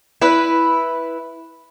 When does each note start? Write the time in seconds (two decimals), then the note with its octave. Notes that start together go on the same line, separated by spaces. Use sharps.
0.22 E4 B4